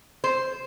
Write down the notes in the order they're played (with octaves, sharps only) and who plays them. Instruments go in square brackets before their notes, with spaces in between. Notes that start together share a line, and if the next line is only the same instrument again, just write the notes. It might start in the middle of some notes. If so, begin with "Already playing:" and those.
[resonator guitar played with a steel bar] C5